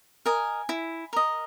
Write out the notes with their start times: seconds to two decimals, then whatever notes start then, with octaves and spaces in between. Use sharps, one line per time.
0.26 A#4 D#5 G#5
0.69 E4
1.13 A#4 D#5